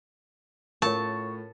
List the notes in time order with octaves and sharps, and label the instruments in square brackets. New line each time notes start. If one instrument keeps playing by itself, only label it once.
[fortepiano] A2 F4 [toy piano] A#4 C#5 [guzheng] A5 [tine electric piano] C#6